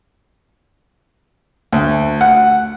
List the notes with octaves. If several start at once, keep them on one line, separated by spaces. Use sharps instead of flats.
D2
F#5